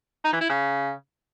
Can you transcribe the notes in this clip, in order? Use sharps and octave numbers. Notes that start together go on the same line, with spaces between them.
D#4
E3
E4
C#3